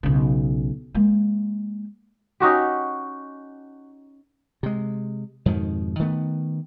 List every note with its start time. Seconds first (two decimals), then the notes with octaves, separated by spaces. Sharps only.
0.03 B1 C#3
0.94 G#3 A#3
2.40 C#4 D#4 F#4 G4
4.63 C3 G#3
5.46 F2 G#2 B2 D#3
5.99 D#3 A3 B3